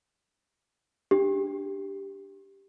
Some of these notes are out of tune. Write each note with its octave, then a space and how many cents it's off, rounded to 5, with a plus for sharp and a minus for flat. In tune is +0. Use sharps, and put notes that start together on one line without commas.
D4 +0 G4 +0